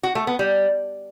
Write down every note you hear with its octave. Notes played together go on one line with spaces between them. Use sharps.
F#4
A3
B3
G3